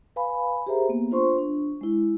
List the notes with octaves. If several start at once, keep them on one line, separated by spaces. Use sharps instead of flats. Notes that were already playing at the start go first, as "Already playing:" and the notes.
B4 F5 G#5 B5
G4 G#4 A#4 C5 E5 A#5
A#3 B3
D4 F4 C5 C6 C#6
D4
G#3 E4